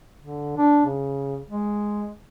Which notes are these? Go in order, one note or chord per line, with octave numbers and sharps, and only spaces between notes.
D3
D4
C#3
G#3